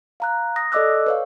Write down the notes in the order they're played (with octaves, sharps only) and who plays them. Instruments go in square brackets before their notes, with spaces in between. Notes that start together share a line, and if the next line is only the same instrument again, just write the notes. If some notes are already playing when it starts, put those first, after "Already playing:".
[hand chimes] F5 A#5 F#6
D#6 A#6
A4 D5 D#5 D6 E6 F#6
B4 C#5 F5